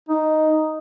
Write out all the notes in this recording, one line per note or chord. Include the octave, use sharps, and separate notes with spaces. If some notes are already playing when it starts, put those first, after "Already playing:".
D#4